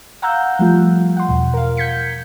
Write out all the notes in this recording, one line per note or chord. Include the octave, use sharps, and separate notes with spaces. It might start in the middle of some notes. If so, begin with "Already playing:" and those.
F5 F#5 A#5 E6 F#6 G6
F3 G3 A3 F4
F#5 C6
E2 B2
A#4 F5
G6 G#6 B6 C#7